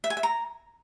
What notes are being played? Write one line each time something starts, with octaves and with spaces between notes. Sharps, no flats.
E5
G#5
E5
A#5